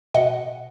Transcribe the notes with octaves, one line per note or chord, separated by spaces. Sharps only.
B2 D#5 F#5